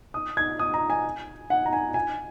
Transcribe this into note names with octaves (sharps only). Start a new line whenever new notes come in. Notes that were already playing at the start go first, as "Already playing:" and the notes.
D#6
G#6
D#6
A#5
G#5
F#5
A#5
G#5
G#5